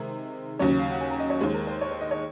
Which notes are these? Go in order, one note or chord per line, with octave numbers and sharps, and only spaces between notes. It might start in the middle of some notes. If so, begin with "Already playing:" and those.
Already playing: C3 D#3 G#3 A#4
D#2 C#3 F#3 C#4 C#5
F5
F#5
G#5
A#5
D#5
C#5
D#2 D#3 G#3 C5
A#4
C5
C#5
C5
D#5
C#5